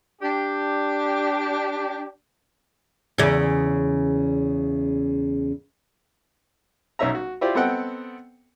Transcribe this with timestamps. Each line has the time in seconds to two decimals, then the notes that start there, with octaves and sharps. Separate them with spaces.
0.22 D4 G4
3.18 E2 C#3
6.99 B1 C#4 D#4 E5 A#5
7.15 F#4
7.41 E4 F4 G4 C5 D5
7.55 B3 C4 A4 D#5 F#5 G5